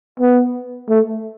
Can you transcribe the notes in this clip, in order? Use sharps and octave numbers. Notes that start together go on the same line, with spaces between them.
B3
A3